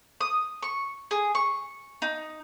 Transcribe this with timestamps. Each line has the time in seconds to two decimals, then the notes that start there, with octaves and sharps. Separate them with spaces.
0.21 D#6
0.63 C#6
1.11 G#4
1.35 C#6
2.02 D#4